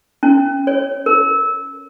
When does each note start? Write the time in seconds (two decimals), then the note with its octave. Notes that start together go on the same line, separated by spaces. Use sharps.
0.23 C#4
0.67 C#5
1.06 A#4